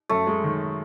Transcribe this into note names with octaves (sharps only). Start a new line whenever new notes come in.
F#2 A3
G#3
D#3